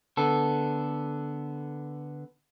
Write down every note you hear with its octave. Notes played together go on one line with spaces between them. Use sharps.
D3 B3 A4